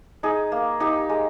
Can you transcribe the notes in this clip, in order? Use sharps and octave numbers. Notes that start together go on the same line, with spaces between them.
D#4 G#4
A#3
D#4 G4
G#3